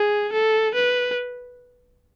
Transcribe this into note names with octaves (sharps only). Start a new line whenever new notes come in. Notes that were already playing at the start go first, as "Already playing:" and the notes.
Already playing: G#4
A4
B4